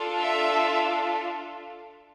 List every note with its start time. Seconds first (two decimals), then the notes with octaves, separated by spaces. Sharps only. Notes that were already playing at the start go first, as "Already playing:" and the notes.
Already playing: D4 F4 A4
0.17 E5